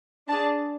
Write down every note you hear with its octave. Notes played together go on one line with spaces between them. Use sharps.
D4 A5
G#4